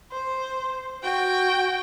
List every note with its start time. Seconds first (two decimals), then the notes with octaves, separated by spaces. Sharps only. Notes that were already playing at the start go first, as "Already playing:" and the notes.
0.11 C5
1.03 F#4 G5